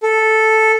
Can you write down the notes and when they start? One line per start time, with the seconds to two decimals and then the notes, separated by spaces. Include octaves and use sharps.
0.03 A4